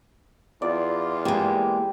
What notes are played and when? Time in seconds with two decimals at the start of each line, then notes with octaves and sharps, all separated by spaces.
0.62 E2 F4 D5
1.25 G#3 A#3 G4